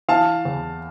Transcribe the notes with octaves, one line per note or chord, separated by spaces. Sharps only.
E3 F5 A5
E2